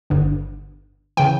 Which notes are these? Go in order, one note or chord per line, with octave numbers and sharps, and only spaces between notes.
G1 G2 D3
C#3 E3 G5